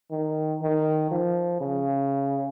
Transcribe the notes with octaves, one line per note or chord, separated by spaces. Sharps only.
D#3
D#3
F3
C#3